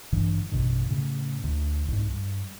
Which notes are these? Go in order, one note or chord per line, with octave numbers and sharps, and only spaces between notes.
A1 G2 D3 E3
A1 F#2 B2 D3
A2 C#3
D2
C2 G#2
G2